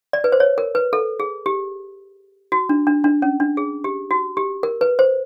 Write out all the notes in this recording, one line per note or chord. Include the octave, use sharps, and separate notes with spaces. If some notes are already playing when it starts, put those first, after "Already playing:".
D5
B4
C5
C#5
A#4
B4
A4
G#4
G4
F#4
D4
D4
D4
C#4
D4
G#4
G4
F#4
G4
A#4
B4
C5